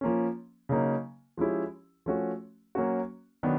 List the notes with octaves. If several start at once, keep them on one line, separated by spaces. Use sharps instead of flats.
F3 A#3 C#4
C#3 F#3 A#3 D#4
F3 G#3 C#4 E4 G4
F3 A3 C#4 F#4
F#3 A#3 C#4 F#4
D#3 F#3 B3 D4